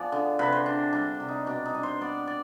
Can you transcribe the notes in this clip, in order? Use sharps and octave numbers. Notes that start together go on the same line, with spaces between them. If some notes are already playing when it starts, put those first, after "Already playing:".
Already playing: F3 B3 G#4 D5
D3
C3 B4
C5
D4
G3 D4
C3
D#4
B2 D4
D#4
D4
C5
B3 D5
D5